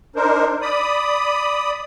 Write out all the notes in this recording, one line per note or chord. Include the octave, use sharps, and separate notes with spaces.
D4 D#4 A#4 C5
D5 B5 D#6